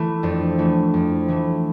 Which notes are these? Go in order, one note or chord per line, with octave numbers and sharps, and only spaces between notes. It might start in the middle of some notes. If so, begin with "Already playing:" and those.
Already playing: E3 A3
F2 D4
E3 A3
F2
E3 A3